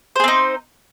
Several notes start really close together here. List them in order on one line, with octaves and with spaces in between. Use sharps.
C5 G#4 C4 D#4